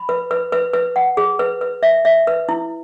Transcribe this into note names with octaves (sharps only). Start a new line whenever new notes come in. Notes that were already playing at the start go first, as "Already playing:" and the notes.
Already playing: B5
B4
B4
B4
B4
F#5
G#4
B4
B4
E5
E5
B4
E4